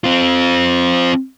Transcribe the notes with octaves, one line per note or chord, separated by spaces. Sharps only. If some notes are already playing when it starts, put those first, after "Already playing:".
C4 F4